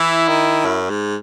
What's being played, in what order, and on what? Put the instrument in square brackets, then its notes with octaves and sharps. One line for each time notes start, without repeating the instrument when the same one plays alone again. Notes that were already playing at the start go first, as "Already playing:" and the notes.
Already playing: [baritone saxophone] E3 [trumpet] E4
[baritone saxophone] D#3
F#2
G#2